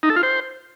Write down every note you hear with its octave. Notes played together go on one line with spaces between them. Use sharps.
D#4
A4
F4
C5